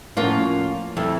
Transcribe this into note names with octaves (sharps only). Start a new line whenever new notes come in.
A2 F3 A#3 C#4 F4 F#5
F2 E4 A4